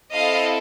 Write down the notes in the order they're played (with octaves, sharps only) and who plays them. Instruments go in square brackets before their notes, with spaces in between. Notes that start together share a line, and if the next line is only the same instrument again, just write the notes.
[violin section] C4 E4 A4 D#5 F5